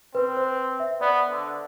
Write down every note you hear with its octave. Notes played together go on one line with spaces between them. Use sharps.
C4 B4
C5
E5
B3 D5
D3